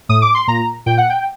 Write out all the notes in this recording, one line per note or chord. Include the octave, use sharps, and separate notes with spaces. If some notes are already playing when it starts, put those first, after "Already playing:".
A2 D#6
D6
C6
A#2 A#5
A#2 G5
F#5
G5